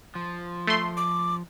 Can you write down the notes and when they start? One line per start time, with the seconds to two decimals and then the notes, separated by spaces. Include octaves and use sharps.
0.15 F3
0.67 A3 C6
0.97 D6